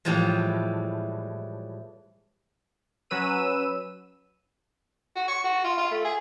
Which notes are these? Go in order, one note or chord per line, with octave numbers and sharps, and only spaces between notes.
A2 E3 F3 G3 G#3
F#3 C#4 B4 E6 D#7
F#4
C#6
F#4
F4
F4
A3
G#4